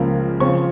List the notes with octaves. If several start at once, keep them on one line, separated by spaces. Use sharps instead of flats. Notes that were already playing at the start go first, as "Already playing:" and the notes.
Already playing: C#2 C#3 F3 A#3
C#3 F3 C4 C#6